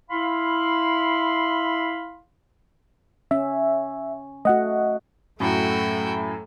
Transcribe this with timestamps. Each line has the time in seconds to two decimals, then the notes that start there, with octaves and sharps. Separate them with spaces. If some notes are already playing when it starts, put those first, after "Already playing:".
0.10 E4 F5 B5 C6
3.31 C#4 E5
4.45 A3 F#4 D#5 F#5
5.40 F#2 A2 A3 F#4 G5